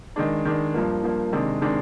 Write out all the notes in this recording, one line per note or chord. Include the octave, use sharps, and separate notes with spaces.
D#3 G#3 D4
D#3 G#3 D4
G2 F3 A#3
G2 F3 A#3
C3 D#3 G#3 D4
C3 D#3 G#3 D4